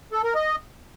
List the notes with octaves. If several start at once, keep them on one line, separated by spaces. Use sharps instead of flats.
A4
A#4
D#5